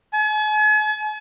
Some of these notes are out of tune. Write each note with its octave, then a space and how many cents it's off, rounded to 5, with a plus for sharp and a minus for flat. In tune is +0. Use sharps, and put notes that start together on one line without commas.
G#5 +45